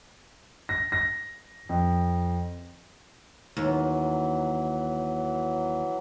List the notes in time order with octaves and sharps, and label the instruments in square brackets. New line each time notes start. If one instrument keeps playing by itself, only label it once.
[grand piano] A#6
A#6
F2
[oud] D#2 [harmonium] E3 F#3